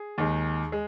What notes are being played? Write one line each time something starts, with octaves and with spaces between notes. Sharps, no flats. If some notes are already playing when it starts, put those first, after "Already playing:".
Already playing: G#4
D#2 D#3 G#3
G#3